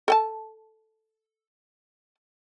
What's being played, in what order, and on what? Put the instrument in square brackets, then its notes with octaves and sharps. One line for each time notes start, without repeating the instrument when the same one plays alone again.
[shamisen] A4 G5 A5